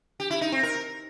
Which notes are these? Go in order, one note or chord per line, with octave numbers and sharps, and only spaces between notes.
G4
E4
D#4
C4
A#4